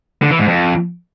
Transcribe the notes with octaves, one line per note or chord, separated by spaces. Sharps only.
D3
E3
G#2
F2